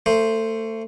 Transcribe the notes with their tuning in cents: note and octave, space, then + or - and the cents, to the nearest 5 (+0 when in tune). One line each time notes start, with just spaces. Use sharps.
A3 +25 C5 +0